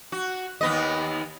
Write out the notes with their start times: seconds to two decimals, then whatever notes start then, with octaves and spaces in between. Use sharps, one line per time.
0.12 F#4
0.61 D#2 B3 D#5